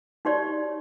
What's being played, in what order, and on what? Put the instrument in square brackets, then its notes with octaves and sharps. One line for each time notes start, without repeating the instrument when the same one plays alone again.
[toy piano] D#4 F#4 G4 C#5 D5